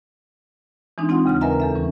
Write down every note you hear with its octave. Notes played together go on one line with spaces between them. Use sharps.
E3 G#3 C4 D4 D#4
C4 D#4 F4 F#5
D#2 C#3 F#5 F6
A#4 B4 D#5 E5 G#5 A#5
E2 A4 E5
E3 G3 C#4